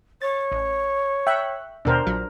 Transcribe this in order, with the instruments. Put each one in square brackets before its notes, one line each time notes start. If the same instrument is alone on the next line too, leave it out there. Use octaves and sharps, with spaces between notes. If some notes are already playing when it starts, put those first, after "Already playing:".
[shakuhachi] C#5 [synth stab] A6
[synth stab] A1
[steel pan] E5 [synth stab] G5 C#6 F#6
[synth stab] D#2 B2 [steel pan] D4 A#4 C5
[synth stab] A#1 F#3